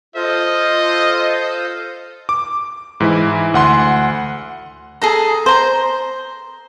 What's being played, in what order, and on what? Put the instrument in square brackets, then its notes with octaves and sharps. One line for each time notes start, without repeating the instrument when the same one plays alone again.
[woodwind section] F4 [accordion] A4 C5 F5 [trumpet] D#5
[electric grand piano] D6
G#2 E3 E4
D2 F#5 C6
[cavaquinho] G#4 A4 A#5
C5 A#5